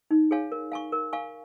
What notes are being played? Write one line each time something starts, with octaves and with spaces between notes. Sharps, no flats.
D#4
G#4 C#5 F5 G#5
A#4
F5 G#5 C#6
A#4
F5 G#5 C#6